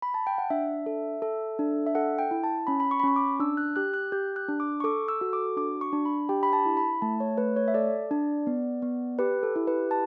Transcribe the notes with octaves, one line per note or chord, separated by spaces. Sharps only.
B5
A5
G5
F#5
D4 E5
A4
A4
D4
E5
A4 F#5
G5
E4
A5
C#4 B5
B5
C#6
B5
C#4 C#6
D6
D4 E6
F#6
G4 F#6
F#6
G4 G6
F#6
D4
D6
C#6
A4 D6
E6
F#4
D6
D4 D6
C#6
D4
B5
G4 G5
B5
A5
E4
B5
A3 A5
C#5
A3 B4
C#5
E5
A4 D5
D4
B3
B3
G4 B4
A4
E4
B4
A5